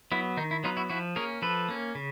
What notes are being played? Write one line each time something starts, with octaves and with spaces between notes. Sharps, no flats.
F#3 B3 E4
D#3 D#4
E4
F#3 B3 D#4 F4
E4 F#4
F3 E4 F#4
A#3 C#4 G#4 A#4
F3 A4 B4
A#3 C#4
C#3